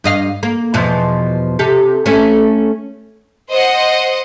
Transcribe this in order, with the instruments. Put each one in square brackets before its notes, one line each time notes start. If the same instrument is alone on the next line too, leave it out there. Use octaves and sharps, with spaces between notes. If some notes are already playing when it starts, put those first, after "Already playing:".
[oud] G2 D#5 F5
A#3
E2 B2 F3
C3 G4 A4
A3 C#4
[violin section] C5 D#5 F#5